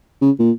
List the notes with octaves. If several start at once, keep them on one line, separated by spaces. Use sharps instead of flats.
C#3
A#2